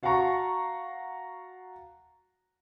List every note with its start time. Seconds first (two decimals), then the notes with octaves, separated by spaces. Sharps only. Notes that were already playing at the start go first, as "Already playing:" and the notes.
0.03 F#4 F5 F#5 A5 A#5 C#6